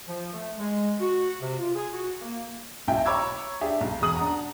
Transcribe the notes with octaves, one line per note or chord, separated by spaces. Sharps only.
F3
A3
G#3
F#4
C3
F4
G#4
F#4
A#3
B1 E4 G5
C#5 A#5 B5 D6 E6 G#6
D4 G4 G#4 E5
B1
E1 G#4 D#6 F#7
D4 F#5 A#5